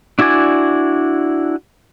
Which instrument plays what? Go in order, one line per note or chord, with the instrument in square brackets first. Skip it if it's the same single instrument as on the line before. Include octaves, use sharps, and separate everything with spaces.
[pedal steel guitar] D4 E4 F#4 D5 G#5